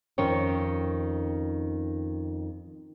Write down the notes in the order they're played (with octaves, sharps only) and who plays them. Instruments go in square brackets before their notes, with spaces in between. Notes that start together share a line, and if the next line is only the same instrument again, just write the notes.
[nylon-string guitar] F2 D#3 C#4 C#5 G5